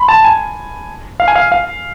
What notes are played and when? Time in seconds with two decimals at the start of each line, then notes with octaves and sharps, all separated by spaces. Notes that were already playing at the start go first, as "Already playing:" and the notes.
Already playing: B5 C6
0.08 A5
0.25 G#5
1.20 F5
1.28 G#5
1.35 F5
1.52 F5